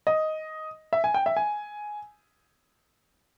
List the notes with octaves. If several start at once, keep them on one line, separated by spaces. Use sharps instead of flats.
D#5
E5
G#5
G5
E5
G#5